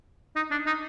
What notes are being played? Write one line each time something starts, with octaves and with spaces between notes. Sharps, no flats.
D#4
D4
D#4